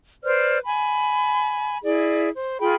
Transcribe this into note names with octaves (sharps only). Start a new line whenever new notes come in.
B4 C5 D5 F6
G#5 B5
E4 G#4 D5
C5
F4 G#4 G5 B5